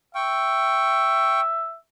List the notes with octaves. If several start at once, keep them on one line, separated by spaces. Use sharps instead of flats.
E5 G5 C#6